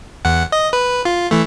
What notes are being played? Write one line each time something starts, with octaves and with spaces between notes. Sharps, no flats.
E2 F#5
D#5
B4
F4
E3 A3